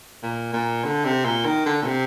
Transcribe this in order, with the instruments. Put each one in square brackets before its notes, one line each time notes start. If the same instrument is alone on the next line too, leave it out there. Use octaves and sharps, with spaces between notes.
[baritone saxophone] A#2
A#2
D3
C3
A#2
D#3
D3
A#2
C3